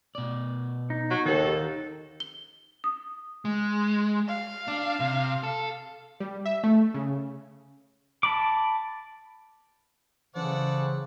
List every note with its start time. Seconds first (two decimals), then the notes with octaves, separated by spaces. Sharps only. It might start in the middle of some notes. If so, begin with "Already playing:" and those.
0.15 B2 D5
0.90 D#4
1.11 F#3
1.26 D#2 D#3 A4 F#5
2.20 G7
2.84 D#6
3.45 G#3
4.28 F5
4.68 D4
5.00 C3
5.43 A4
6.20 G3
6.45 E5
6.64 A3
6.94 C#3
8.23 A5 B5 D6
10.35 C#3 E3 F#3 C#4 A4 C5 D5 F#5